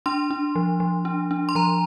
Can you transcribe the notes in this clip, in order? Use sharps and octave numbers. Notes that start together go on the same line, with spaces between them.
D4 C6
D4
F3
F3
D4
D4
C6
F3 A#5